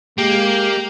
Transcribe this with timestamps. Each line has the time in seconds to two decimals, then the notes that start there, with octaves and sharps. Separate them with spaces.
0.19 G#3 A#3 G4